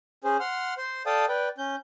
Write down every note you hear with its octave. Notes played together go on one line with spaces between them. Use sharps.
C#4 G#4 C5
F#5 C6 F6
C5 C6
A4 D5 F5 G5 A5 D#6
B4 D5 G5
C#4 G6